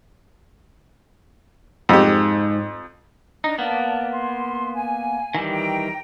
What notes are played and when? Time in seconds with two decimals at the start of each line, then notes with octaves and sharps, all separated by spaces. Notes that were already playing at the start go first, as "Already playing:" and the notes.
1.89 F2 G#2 G4
3.44 D4 D#4 A#5
3.58 A#3 B3 D5 A5
4.12 C6
4.74 G#5
5.35 D#3 E3 G3
5.51 G5 A#5